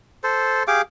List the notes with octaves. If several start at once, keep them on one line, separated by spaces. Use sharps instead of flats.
A4 C5
G4 G#4 F5 D6